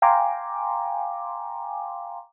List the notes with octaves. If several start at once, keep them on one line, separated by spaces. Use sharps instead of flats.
F5 G5 G#5 A#5 C6 D6